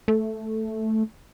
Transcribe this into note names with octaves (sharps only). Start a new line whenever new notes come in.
A3